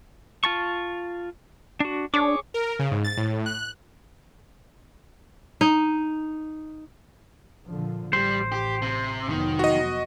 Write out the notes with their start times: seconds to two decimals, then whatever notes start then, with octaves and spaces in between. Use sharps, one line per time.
0.44 F4 A5 C#6
1.80 D4 F#4
2.14 D4 G#4 C#5 D6
2.54 A#4
2.79 C#3
2.91 G#2
3.04 A6
3.17 A2
3.46 F#6
5.61 D#4
7.69 A#2 D3 F3
8.13 A1 G3 C5
8.52 G4
8.82 C3
9.29 F1 D#3 F#3 B3
9.59 F#4 D#5